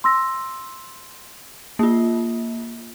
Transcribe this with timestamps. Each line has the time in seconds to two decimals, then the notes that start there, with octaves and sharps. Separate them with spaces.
0.04 C6 E6 A#6
1.79 A#3 F4